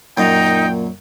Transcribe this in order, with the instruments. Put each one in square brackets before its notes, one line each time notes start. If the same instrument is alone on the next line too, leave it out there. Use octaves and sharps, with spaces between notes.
[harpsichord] F#2 [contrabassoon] A#2 [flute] D#4 [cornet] G5